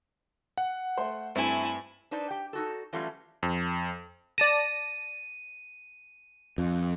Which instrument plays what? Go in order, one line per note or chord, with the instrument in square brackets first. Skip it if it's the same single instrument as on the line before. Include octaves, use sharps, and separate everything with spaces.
[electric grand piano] F#5
[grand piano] A3 C5
[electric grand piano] G2 [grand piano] A3 C4 [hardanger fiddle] E4 G#5
[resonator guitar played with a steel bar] D4 D#4 B4 C5 D5
G4 G5
D#4 F#4 A4
E3 F#3 G3 A3 C#4 F4
[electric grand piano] F2
[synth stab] D5 A5 A#6 [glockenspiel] D#7
[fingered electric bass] F2